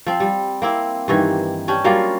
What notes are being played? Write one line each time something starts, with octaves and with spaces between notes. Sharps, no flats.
F3 C4
G3
A#3 C4 E4
G2 D#3 E3
C#4 D4 G4
F#3 G3 A#3 F4